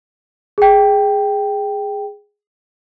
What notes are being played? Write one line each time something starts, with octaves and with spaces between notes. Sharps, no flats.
G#4 G5